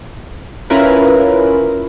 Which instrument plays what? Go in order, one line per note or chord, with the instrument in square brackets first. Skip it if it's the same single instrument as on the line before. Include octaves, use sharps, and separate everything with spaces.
[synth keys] C#4 E4 F4 A#4 B4